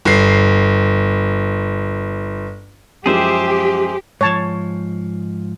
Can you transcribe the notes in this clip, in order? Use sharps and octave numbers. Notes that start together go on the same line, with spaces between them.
G1 C7
F#2 F3 G#3 G4 G#4 C5 E5
G#2 F3 C#5 A5